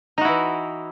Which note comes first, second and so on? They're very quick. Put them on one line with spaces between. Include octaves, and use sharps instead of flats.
D#4 F#4 E4 E3